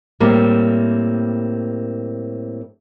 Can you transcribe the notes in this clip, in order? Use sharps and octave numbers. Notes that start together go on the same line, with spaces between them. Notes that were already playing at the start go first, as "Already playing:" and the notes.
A2 G3 A#3 C4